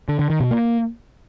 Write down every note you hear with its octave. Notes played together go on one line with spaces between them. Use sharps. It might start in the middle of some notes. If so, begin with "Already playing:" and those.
D3
D3
D#3
B2
A#3